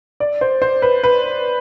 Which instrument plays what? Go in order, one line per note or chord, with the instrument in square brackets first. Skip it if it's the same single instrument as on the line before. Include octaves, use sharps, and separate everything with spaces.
[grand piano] D5
C5
C5
B4
B4